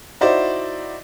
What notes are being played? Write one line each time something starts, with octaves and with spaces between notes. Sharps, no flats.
D#4 E4 F#4 C5 D5